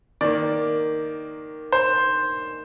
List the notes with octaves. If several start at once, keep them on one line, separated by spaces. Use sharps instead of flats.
D#3 A#3 D5
C5